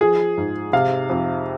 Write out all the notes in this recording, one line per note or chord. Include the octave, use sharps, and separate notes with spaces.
F3 G#4
G#2
C3 F5
F2